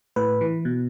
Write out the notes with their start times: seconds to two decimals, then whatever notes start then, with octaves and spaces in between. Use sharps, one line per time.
0.16 A2 B4
0.41 E3
0.65 B2